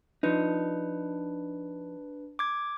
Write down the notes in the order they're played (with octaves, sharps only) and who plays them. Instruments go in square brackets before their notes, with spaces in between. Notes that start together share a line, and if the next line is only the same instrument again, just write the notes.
[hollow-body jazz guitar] F3 D#4 [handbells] D4 B4
[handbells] D6 G#6